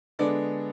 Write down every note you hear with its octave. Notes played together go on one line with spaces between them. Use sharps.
D3 G#3 B3 D4 D5